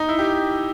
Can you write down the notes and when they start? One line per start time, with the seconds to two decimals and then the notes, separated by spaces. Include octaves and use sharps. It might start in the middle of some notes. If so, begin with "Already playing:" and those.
Already playing: D#4
0.09 E4
0.19 G4